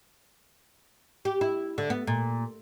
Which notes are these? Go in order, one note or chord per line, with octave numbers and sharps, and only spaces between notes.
G4
E4
D3
B3
A#2